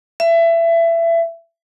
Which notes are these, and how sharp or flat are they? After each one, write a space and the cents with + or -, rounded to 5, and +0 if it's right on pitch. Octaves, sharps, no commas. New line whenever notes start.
E5 +25